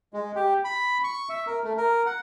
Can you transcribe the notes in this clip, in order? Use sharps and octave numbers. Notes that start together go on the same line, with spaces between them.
G#3
G4
B5
C#6
E5
A#4
A3
A#4
F#5